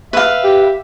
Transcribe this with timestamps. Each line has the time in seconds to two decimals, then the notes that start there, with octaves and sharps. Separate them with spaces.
0.13 B4 E5 F5
0.44 G4